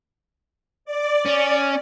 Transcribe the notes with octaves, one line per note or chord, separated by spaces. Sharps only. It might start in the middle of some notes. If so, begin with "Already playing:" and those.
D5
C#4